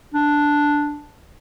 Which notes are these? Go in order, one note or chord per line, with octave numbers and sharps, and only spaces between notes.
D4